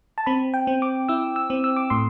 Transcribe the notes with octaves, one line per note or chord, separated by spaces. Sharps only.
A5
C4 B5
G5
C4
D6
E4 E6
E6
C4
E6
D6
A2 C6